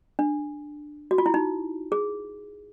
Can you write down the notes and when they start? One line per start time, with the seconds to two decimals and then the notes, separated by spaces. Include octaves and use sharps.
0.19 D4
1.11 F#4
1.18 F4
1.26 E4
1.34 D#4
1.92 G#4